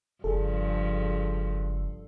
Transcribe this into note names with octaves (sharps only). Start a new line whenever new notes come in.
F#1 G2 F3 G#4 A4